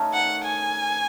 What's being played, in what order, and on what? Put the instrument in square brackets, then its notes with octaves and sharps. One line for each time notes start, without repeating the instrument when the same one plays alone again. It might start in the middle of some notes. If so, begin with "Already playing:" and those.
Already playing: [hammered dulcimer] D#3 A3 C#4
[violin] F#5
G#5